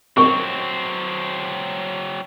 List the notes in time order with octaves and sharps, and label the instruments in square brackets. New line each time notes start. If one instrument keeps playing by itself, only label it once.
[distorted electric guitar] F#3 C4 [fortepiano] C#6